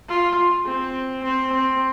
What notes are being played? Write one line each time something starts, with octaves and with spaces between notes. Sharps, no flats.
F4
C4
C4
C4